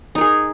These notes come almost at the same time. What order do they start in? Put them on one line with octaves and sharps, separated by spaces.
D#4 A#4 G#4